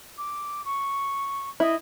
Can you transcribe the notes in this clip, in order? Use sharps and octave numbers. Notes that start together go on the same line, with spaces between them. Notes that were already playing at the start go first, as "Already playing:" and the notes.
D6
C#6
E4 D#5